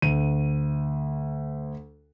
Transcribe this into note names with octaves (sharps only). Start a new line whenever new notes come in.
D2 D#7